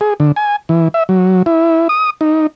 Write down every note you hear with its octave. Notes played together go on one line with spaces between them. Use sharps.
G#4
D3
G#5
E3
E5
F#3
E4
D#6
D#4